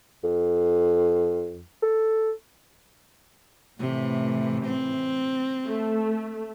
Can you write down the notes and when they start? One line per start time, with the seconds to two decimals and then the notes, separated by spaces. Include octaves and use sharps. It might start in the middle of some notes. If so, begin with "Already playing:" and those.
0.23 F2
1.82 A4
3.80 A2 C3 E3
4.66 C4
5.66 A3